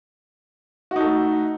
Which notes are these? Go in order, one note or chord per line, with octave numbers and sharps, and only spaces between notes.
A3 D#4 F#4 A4